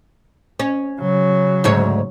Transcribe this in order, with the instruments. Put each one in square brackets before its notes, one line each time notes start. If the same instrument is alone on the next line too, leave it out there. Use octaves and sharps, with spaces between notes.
[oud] C#4
[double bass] C#3 F#3
[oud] D2 G#2 C#5